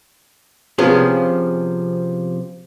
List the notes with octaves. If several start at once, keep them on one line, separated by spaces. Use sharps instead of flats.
C3 F3 B3 C#4 G#4